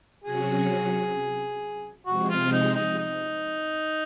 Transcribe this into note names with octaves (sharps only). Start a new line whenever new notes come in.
C3 F#3 C#4 F#4 G#4
C3 F3 G#3 C4 F#4
F4
D#4
D#4
D#4